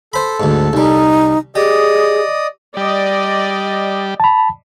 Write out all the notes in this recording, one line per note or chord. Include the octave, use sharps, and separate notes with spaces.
A4 C5 B5
D2 G#2
C2 G3 D#4
G4 G#4 D5 D#5 D#6
G3 D5 D#5
A5 B5